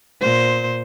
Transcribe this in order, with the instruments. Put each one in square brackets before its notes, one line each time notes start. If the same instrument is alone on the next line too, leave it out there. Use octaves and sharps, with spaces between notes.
[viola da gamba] A#2 C5